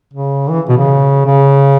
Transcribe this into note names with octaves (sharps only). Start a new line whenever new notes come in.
C#3
E3
B2
C#3
C#3